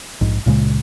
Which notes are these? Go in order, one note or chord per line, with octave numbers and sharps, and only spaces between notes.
A#1 G#2
C#2 A#2 C#3 G#3